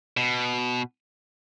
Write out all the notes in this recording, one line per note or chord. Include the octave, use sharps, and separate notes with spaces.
B2